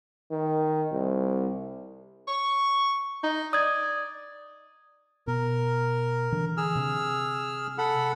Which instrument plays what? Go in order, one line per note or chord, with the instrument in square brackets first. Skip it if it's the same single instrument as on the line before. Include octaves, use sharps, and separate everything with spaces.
[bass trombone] D#3
C2
[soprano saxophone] C#6
D#4
[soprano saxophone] D5 [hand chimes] D#6 G#6
[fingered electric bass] B2 [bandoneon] A#4
[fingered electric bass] D3 E3
[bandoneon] G#4 E6 F6
[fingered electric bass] C3
[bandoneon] A4 F#5 B5